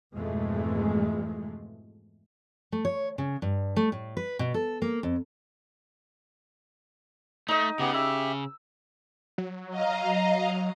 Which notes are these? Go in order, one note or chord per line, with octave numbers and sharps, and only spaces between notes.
F2 G#2 B2 E3 G#3 A3
A3
C#5
C#3
G2
A3
A2
B4
B2
A4
A#3
F2
A3 D#4 D#5
C#3 B3 G4
G4 E5 E6
F#3
D#5 F5 A#5